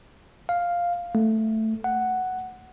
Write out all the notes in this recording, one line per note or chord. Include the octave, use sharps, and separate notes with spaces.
F5
A3
F#5